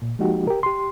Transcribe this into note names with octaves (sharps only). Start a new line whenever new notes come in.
A#2
F3 G#3 A#3 D#4 F#4 G4
G4 A#4
G4 C6